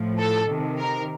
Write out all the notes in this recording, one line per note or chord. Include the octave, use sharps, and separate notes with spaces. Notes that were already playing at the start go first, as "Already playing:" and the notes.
Already playing: A2 F3
A4
C3 D#3
A#4